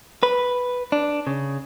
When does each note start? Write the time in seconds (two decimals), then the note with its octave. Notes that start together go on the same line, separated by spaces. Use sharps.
0.23 B4
0.92 D4
1.27 C#3